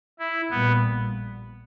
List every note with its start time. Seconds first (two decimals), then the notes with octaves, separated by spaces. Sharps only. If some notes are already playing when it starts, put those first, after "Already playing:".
0.19 E4
0.50 A#1 A#2 G3 B3